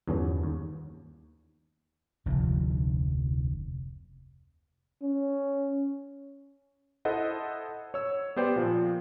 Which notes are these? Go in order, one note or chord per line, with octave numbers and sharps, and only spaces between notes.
E2 G2 D3 F3 C#4
D#2
F1 D2 F3
C#4
E4 A4 C5 D#5 F#5
C#5 E6
B3 G4 C5 D5 G5
A#2 F3